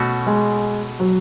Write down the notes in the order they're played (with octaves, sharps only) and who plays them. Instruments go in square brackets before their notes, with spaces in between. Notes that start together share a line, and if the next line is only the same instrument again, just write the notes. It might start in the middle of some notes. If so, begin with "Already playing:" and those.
Already playing: [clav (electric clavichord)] B2 A3 C#4 F#4
[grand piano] G#3
F#3